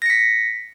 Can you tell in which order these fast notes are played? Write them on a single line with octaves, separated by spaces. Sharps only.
A#6 C#7 B6